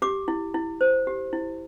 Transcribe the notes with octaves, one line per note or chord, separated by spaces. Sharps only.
G4 D6
E4
E4
C5
G4
E4